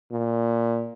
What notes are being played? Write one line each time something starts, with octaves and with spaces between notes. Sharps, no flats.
A#2